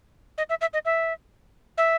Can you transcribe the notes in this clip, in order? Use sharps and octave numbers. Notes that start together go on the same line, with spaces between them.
D#5
E5
E5
D#5
E5
E5